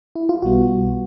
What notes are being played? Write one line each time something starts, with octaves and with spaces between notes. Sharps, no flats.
E4
F4
B1 B2 G3 B3 F#4